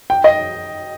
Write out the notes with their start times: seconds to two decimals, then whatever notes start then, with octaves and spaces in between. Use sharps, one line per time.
0.10 G5
0.24 D#5